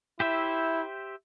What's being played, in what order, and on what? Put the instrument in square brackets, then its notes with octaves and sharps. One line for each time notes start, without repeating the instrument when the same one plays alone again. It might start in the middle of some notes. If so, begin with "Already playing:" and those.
[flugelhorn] E4 [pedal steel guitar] G4 C5 E5